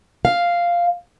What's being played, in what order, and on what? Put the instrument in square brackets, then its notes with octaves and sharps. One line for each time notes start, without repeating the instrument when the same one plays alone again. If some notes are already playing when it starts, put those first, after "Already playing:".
[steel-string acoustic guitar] F5